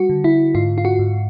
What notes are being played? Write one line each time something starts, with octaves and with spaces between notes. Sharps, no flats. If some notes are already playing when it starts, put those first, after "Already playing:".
Already playing: G3 F#4
D3
E4
G#2 F4
F4
F#4
G#2